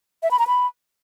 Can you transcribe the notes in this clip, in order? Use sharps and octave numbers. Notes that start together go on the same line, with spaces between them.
E5
B5
A#5
B5